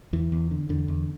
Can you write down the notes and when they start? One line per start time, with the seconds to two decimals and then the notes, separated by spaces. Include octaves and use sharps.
0.13 E2 E3
0.32 E2
0.51 D3
0.69 E2 D3
0.88 E2